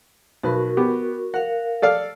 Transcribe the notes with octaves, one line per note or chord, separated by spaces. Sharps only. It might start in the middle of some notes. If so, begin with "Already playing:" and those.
B1 F#4 A#4 B4 C#6
B3 G4
A#4 F5 F#5
A4 D5 F5